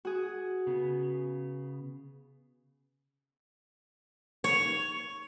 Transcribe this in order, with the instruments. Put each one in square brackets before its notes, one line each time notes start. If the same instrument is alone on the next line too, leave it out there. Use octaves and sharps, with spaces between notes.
[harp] F#4 G#4
[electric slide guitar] C#3 B3
[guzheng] C#5